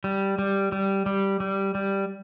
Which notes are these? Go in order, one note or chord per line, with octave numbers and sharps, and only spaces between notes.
G3
G3
G3
G3
G3
G3